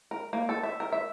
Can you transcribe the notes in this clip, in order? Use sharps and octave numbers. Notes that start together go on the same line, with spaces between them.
A#4
A#3
A4
E5
A#4
E5